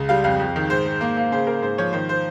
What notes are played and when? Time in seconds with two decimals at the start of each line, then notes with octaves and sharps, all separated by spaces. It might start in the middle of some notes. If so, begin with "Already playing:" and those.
Already playing: C#2
0.09 G3 F5
0.24 F2 F5
0.40 F2
0.56 D#3
0.70 G#2 C5
0.86 G#2
1.01 A#3
1.17 A#3
1.32 C#3 C5
1.47 A#3 A#4
1.62 G#2 C5
1.78 F3 C#5
1.93 D#3 C5
2.09 C5